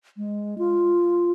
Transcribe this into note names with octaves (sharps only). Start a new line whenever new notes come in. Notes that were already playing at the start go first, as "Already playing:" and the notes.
G#3
F4